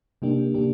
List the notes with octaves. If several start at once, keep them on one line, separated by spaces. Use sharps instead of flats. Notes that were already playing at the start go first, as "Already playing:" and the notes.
C3 A#3 D4 G4
C3 A#3 D4 G4